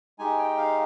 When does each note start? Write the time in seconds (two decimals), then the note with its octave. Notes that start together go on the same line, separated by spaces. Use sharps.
0.19 G#3 D#4 G4 G#5
0.38 G5
0.57 F5